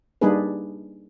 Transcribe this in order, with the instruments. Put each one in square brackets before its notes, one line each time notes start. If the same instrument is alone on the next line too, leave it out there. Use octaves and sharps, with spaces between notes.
[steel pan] G3 A#3 D4 D#4 G#4 B4